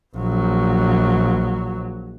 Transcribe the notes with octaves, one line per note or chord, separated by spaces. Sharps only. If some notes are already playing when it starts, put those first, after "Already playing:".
A#1 F#3